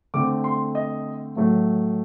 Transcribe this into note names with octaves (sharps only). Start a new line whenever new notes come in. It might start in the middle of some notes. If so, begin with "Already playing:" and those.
D3 A3 C4 D6
C6
D#5
A2 F#3 A3